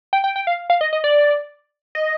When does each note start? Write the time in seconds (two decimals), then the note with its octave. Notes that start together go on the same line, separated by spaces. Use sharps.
0.13 G5
0.24 G5
0.36 G5
0.47 F5
0.70 F5
0.81 D#5
0.93 D#5
1.04 D5
1.95 D#5